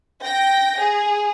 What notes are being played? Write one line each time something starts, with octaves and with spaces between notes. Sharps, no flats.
G5 A#6
G#4